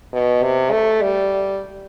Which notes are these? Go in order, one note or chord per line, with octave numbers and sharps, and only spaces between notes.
B2
C3
A3
G3